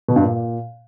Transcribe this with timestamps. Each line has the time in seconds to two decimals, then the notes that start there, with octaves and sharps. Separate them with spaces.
0.08 B2
0.16 G2
0.24 A#2